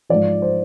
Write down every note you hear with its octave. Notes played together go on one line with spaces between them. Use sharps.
G#2 F3 D5
C5